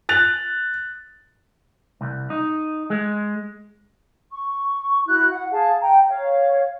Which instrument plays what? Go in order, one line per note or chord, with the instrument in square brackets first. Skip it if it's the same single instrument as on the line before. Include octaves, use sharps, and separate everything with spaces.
[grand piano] F#6 A6 F7
[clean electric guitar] C2
D#4
G#3
[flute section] C#6
E4 F#4 F#6
F#5
G#4 F5 A5
G5 A#5
C#5 F5